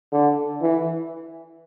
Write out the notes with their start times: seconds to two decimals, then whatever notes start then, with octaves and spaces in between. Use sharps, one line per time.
0.12 D3
0.61 E3